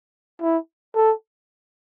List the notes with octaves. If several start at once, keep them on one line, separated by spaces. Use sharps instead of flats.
E4
A4